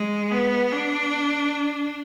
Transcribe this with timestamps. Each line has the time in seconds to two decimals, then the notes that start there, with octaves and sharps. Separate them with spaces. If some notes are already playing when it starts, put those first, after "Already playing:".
Already playing: G#3
0.32 B3
0.72 D4